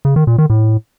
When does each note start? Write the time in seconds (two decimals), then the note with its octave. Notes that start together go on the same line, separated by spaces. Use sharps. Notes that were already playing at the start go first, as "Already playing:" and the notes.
0.05 C#3
0.16 D#3
0.27 A#2
0.38 D#3
0.50 A2